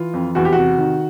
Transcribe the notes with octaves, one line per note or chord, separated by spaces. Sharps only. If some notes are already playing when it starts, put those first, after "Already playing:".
Already playing: E3 F4
F2
E2 F#4
G4
C3 F#4
D#3